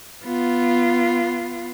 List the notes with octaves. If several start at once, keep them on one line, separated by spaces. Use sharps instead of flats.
B3 F4